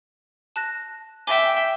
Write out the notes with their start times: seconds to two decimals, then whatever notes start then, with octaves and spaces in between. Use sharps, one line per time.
0.56 A5 F#6 A#6
1.27 E5 G5 G#5 D6 G7